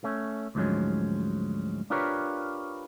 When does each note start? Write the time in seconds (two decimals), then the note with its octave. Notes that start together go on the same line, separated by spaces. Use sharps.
0.04 A3 C#4
0.55 D2 G#2 F3 F#3 G#3 C#4
1.90 D4 F4 G4 A#4 B4 C#5